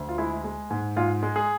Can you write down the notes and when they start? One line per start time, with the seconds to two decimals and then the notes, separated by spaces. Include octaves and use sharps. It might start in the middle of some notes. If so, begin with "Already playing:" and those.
Already playing: D2
0.09 F4
0.18 G#3 E4
0.44 G#3
0.71 G#2
0.96 G#2 F4
1.23 G#3
1.36 G#4